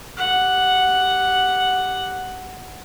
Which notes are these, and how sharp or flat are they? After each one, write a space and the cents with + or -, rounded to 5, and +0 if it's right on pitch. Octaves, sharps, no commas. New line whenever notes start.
G4 +0 F#5 +0